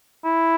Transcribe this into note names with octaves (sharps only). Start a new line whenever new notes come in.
E4